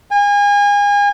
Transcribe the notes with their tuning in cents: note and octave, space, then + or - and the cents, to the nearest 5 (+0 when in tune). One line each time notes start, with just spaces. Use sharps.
G#5 -35